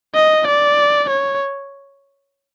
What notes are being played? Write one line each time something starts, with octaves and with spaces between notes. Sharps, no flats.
D#5
D5
C#5